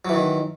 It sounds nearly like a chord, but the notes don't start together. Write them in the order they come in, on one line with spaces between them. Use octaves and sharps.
F#3 E3 D#3